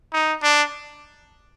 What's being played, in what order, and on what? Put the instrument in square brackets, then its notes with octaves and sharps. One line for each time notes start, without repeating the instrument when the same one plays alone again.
[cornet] D#4
D4